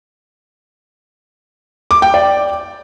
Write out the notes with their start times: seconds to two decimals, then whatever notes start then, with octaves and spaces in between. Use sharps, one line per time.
1.91 D6
2.02 G5
2.14 D5